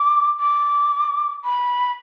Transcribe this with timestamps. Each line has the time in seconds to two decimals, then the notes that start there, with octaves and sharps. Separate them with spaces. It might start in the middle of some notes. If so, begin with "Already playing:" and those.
Already playing: D6
0.40 D6
1.44 B5